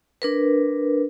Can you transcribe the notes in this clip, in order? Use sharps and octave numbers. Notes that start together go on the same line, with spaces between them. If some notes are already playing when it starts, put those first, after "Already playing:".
D4 A#4 B4